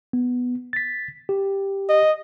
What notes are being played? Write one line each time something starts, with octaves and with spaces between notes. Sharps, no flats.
B3
A6 B6
G4
D#5